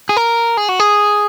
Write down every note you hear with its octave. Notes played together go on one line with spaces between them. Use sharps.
G#4
A#4
G#4
F#4
G#4